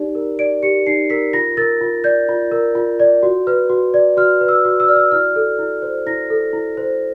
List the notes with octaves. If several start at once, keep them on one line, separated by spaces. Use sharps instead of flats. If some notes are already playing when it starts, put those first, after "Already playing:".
Already playing: D#4 G4 D5
A#4
D5 D7
G4 C#7
D#4 C7
A#4 B6
F4 A#6
A#4 A6
F4
D5 G6
F4
A#4
F4
D5
F#4
B4
F#4
D5
F#4 F6
B4
E6
F#4
E6
D5 F6
E6
E4 F6
A4
E4
C5
E4 A#6
A4
E4
C5